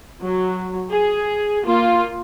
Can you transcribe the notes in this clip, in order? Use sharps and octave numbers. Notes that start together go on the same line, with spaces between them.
F#3
G#4
A#3 F4